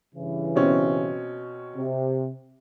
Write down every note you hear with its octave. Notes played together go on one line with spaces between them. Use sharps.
G2 C#3 E3
B2 C4 C#4
C3